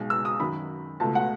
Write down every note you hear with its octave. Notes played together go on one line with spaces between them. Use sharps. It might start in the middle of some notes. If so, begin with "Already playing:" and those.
Already playing: B1 B2 G#3
E6
D#6
F#2 D#3 F#3 B5
C#2 B2 A3 A5
F#5